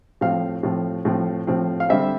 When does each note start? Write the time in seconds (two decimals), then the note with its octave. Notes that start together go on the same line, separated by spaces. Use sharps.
0.21 A2 F3 C4 F5
0.63 A2 F3 C4
1.05 A2 F3 C4
1.47 A2 F3 C4
1.80 F5
1.89 D3 G3 C4 E5